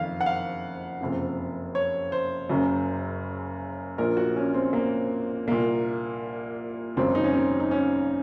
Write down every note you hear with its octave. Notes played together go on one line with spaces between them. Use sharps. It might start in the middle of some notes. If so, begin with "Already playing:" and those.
Already playing: F#1 F2 D#3 F5
F#5
F5
F#1 F2 C3
C#5
C5
F#1 F#2 C#3
A#1 A#2 A#4
F#4
C#4
C4
A#3
C2 A#2 A#3
G#1 F#2 C#3 C4
D#4
C#4
C4
D#4
C#4